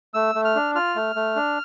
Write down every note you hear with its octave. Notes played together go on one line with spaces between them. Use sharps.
A3 E6
A3
F6
D4
F4 F6
A3
A3
D4